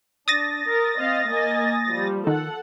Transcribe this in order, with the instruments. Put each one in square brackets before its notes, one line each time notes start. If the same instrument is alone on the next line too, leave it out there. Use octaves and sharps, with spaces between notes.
[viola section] D4 [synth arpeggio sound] D#6 A6 A#6
[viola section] A#4
C4 D#5 F5
A#3 D#5 G#5
F3 G3
[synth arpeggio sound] D#3 [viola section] A4 F#5